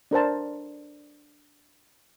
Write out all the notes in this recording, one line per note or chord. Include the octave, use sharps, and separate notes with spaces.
D4 A#4 C5 A5